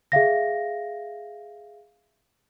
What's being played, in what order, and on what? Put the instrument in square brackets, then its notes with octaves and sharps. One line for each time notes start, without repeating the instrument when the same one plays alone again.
[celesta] G#4 E5 F5 A#6